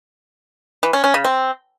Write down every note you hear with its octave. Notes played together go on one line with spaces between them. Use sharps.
E3
C#4
C#4
C#3
C4